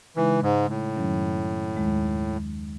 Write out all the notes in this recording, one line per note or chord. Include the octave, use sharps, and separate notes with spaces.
C#3 E3 G#3 D#4
G#2
A2
F#2 D#3 F#3 C#4
D#2 D#3 G#3